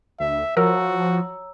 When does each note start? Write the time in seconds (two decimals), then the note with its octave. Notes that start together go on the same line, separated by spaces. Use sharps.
0.20 D2 E5
0.57 F3 F#4 A#4 C#5 A#5 E6